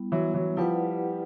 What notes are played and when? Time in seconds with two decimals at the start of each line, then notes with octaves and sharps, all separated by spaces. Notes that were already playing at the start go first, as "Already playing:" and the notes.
Already playing: G3 B3 E4
0.12 E3 F#3
0.34 E3 F#3
0.57 F3 G3 E4 G4 B4 D5 F#5